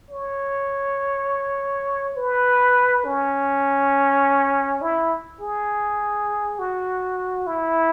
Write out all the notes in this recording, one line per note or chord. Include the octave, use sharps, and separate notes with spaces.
C#5
B4
C#4
E4
G#4
F#4
E4